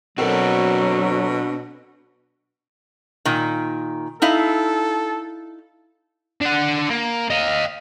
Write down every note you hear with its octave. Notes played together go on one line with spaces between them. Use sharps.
B2 F#3 C4 D4 F#4 A4 A#4
A#2 D#3
D#4 E4 A4 F5
D4 F#5
A#3
D#5 F5